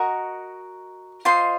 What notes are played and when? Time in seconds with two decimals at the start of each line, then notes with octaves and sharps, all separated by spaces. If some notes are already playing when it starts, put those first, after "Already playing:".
Already playing: F#4 A#4 D#5 C#6
1.25 F4 C5 D#5 C6